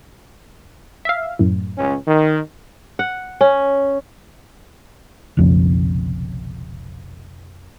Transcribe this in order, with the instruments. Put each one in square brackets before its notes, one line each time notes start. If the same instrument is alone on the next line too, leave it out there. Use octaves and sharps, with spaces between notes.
[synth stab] E5 F5
F#2 A2
[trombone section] C#2 C#4
D#3
[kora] F#5
C#4
[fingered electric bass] F1 B1 F2 C#3